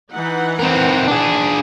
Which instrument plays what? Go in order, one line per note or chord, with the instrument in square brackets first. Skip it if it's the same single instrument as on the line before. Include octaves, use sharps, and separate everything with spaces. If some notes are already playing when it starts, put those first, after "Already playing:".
[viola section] E3 D#4 F#5
[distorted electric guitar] C4 A#4
D4 G#4